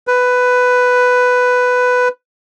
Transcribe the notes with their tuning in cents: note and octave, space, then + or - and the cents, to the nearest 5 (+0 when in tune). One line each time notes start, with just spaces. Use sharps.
B4 +10